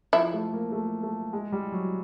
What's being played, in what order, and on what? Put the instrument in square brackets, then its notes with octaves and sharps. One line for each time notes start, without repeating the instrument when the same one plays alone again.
[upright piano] F3 [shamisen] E4
[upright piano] A3
A#3
A3
A3
G#3
G3
F#3